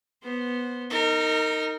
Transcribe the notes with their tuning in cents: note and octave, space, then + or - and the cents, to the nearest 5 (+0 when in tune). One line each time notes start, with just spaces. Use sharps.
B3 -10 C5 +0
D#4 +5 A#4 -25